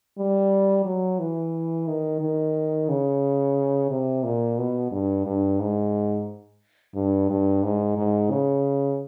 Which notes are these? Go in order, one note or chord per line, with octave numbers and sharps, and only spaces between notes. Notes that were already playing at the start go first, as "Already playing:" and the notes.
G3
F#3
E3
D#3
D#3
C#3
C3
A#2
B2
G2
G2
G#2
G2
G2
G#2
G#2
C#3